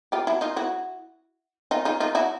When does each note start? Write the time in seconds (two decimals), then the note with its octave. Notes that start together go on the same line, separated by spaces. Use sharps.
0.12 F4 G4
0.27 E4 F#4
0.41 D#4 F4
0.56 E4 F#4
1.71 D#4 F4
1.85 D#4 F4
2.00 D#4 F4
2.15 E4 F#4